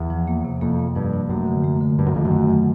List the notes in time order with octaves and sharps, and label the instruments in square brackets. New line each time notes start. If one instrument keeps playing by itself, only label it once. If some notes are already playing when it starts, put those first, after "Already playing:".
Already playing: [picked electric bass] E2
[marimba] F3
A#3
C3
[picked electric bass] F2 [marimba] A#3
[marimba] A#3
[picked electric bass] G2 [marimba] F3
[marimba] F3
[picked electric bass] F#2 [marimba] A3
[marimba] D3
A3
D3
[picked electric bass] G2 [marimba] A3
[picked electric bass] F#2
[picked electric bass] F2 [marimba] D#3
[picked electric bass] F#2
[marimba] A3
F#3